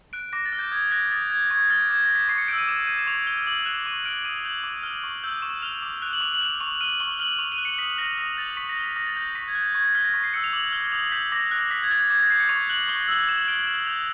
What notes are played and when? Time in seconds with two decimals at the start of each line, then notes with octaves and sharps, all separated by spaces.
0.13 F#6 D7
0.33 D6 A#6
0.46 A6
0.52 F6
0.59 G6
0.72 D#6 G#6
0.91 F#6 A#6
1.11 D#6 A6
1.30 G6 G#6
1.50 C#6 G#6
1.70 F6 A6
1.89 D6 G#6
2.03 A#6
2.09 G6
2.15 B6
2.28 C#6 C7
2.38 C#7
2.48 E6 G6 D7
2.58 D#7
2.67 D6 E7
2.87 G6 D#7
2.99 E7
3.07 C#6 F7
3.27 F6 G7
3.47 D6 F#7
3.62 F7
3.66 F#6 E7
3.86 C#6 D#7
4.05 F6 D7
4.24 D#6 D#7
4.45 G6 F#7
4.64 D6
4.83 F6
5.04 C#6
5.24 E6 G6
5.42 C#6 E7
5.62 F6 F7
5.82 D6
6.02 F#6 F7
6.13 F#7
6.21 D6 F7
6.34 F#7
6.40 F#6 F7
6.60 C#6 F7
6.81 F6 D#7
7.00 C#6 G7
7.19 F6 F#7
7.39 C#6 F7
7.52 D#7
7.58 F#6
7.65 C#7
7.78 D#6 B6
7.98 F#6 A#6
8.18 D#6 A#6
8.37 G6 A6
8.57 C#6 B6
8.69 A#6
8.77 F6
8.83 B6
8.96 D#6 A#6
9.07 A6
9.16 G6 A#6
9.35 C#6 B6
9.48 G#6
9.55 F#6
9.61 G6
9.75 C#6 G#6
9.85 A#6
9.95 F6 B6
10.04 A#6
10.13 C#6 B6
10.24 C7
10.33 E6 G6 C#7
10.44 F7
10.53 D6 F#7
10.72 F6 G7
10.92 D#6 F7
11.12 G6 B6
11.32 D6 A#6
11.51 F#6 A#6
11.71 D#6 B6
11.83 G#6
11.90 F#6 A6
12.10 D6 G#6
12.19 A#6
12.30 G6 C7
12.40 C#7
12.49 C#6 F7
12.69 F#6 F#7
12.88 C#6 G7
13.08 E6 G6 F#7
13.28 D6 E7
13.48 F6 D7
13.67 D#6 E7
13.87 G6 F7